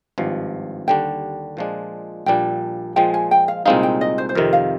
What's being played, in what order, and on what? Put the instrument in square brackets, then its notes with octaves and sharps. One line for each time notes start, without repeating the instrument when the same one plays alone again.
[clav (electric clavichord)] G#1 G2 F3
[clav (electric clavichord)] D#2 D3 G3 D4 [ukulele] G5
[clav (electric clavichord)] A#2 F3 G#3 D4
[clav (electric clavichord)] A#1 A#2 G3 D4 [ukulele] G5
[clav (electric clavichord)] A#2 F3 G#3 [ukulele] G5
[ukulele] G#5
G5
F5
[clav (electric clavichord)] C2 A#2 G#3 C4 D#4 [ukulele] F5
[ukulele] G5
D#5
C5
C5
[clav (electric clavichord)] F2 C3 D#3 [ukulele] A#4
[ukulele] F5